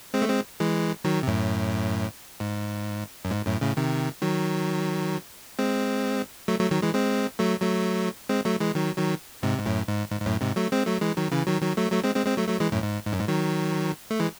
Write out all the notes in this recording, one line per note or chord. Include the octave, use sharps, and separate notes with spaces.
G#3 C4
A3
G#3 C4
E3 G#3
D#3 F#3
C3
F#2 A2
G#2
F#2
G#2
F#2 A2
A2 C#3
C3 D#3
D#3 F#3
G#3 C4
F#3 A3
F#3 A3
D#3 F#3
E3 G#3
G#3 C4
F#3 A3
F#3 A3
G#3 C4
F#3 A3
E3 G#3
D#3 F#3
D#3 F#3
G#2 C3
G#2
F#2 A2
G#2
G#2
G#2
F#2 A2
G#2 C3
F#3 A3
G#3 C4
F#3 A3
E3 G#3
D#3 F#3
C#3 E3
D#3 F#3
D#3 F#3
F#3 A3
F#3 A3
G#3 C4
G#3 C4
G#3 C4
F#3 A3
F#3 A3
E3 G#3
F#2 A2
G#2
G#2
F#2
G#2
D#3 F#3
A3
E3 G#3